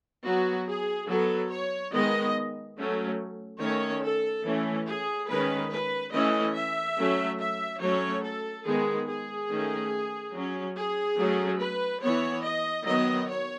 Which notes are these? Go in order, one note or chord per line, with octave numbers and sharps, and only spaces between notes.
F#3 B3 F#4
G#4
F#3 B3 A4
C#5
D#3 G#3 B3 D#5
F#3 A3 C#4
D#3 A3 C#4 C#5
A4
E3 A3 C#4
G#4
D#3 G#3 C#4 B4
B4
E3 A3 C#4 D#5
E5
F#3 A3 C#4
E5
F#3 A3 C#4 C#5
A4
D#3 G#3 B3 G#4
G#4
D#3 A3 C#4
F#3 C#4
G#4
F#3 A3 C#4
B4
E3 B3 C#5
D#5
D#3 F#3 B3 D#5
C#5